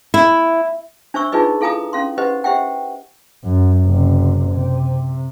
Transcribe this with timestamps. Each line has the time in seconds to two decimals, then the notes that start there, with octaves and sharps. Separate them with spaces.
0.14 E4
1.14 D4 C5 E5 C#6 E6
1.32 D4 D#4 F4 G#4 B4 D#5
1.61 E4 A4 F5 G#5 A#5 D#6
1.93 C#4 F5 C6
2.18 G4 B4 C5 D#5 F#5
2.44 G4 C5 E5 F#5 G5
3.44 F#2
3.86 F#1 C3
4.51 C3